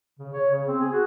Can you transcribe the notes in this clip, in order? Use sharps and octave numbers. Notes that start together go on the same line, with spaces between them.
C#3
C#5
C#3
C4
G#4
F#4